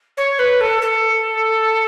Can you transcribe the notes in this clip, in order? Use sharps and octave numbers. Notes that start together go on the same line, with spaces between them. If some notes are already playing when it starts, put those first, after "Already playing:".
C#5
B4
A4
A4